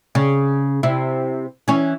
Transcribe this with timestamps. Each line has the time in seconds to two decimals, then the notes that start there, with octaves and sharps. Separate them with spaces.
0.15 C#3
0.83 C3 E4
1.68 E3 C#4